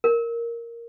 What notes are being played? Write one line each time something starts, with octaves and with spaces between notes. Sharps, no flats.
A#4